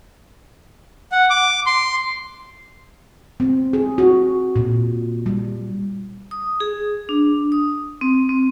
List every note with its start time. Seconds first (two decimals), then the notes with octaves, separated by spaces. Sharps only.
1.12 F#5
1.30 D6
1.66 C6
3.40 C4
3.73 G#4
3.98 F#4
4.56 A#2
5.26 G3
6.31 D#6
6.60 G#4
7.09 D4
7.52 D#6
8.01 C4
8.29 C4